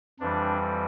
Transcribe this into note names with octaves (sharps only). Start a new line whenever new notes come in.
F2 E3 G3 D4